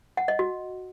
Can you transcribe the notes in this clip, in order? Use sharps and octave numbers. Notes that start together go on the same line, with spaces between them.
F#5
D#5
F#4